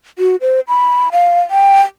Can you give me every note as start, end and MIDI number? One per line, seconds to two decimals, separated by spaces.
0.19 0.36 66
0.41 0.60 72
0.68 1.09 83
1.12 1.40 77
1.51 1.81 79